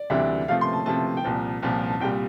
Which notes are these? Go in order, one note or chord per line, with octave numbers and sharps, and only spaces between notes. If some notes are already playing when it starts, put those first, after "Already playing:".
Already playing: D5
D2 C3 E3 G3 D4 E5
C3 F3 A3 F5
C6
A5
C3 F3 A3 A5
G5
C2 A#2 F3 A5
C2 A#2 F3 A5
A5
C2 A#2 G3 G5